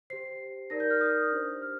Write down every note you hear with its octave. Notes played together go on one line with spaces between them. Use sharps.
G4 C5 C7
D#4 A#4 D5 A#6
G6
F6
D#6
D4 G4 C5
F6